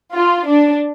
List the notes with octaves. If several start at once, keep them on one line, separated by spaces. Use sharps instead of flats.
F4
D4